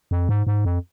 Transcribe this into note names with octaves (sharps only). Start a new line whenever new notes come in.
F2
G#2
G#2
F2